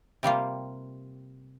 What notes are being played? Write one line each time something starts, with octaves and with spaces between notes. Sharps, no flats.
C3 G3 A#3 F4